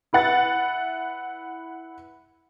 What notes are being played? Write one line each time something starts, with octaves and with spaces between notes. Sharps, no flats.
E4 B4 F#5 A6